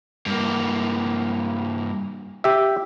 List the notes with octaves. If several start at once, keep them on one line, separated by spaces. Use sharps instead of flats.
G2 A#3
G4 E5